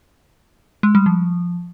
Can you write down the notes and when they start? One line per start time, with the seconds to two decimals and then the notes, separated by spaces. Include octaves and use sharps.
0.83 G#3
0.95 G3
1.06 F3